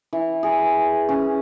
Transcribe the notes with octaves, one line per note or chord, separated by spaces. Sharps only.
E3
G#4
C#4